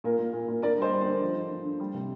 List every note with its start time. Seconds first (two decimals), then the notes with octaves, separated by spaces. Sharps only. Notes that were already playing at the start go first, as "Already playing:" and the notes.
0.04 A#2 A#4
0.19 A#2
0.33 A#2
0.48 A#2
0.62 D3 A#4 D5
0.78 G3 C5 D#5
0.92 G3
1.01 C5
1.06 D3
1.21 F3
1.36 D3
1.50 D3
1.65 D3
1.80 G3
1.94 C3